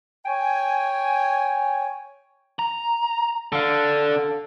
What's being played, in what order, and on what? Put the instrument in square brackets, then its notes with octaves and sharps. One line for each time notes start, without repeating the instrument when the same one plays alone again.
[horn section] C#5 G5 G#5
[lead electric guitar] A#5
[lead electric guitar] D3 [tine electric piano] A4 F5